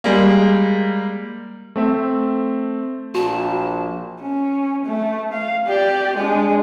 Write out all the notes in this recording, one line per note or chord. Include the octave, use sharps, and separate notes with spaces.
G3 G#3 A#3
A3 C4 E5
A#1 F#4 A5
C#4
A3
F5
G4 D5
G#3 D4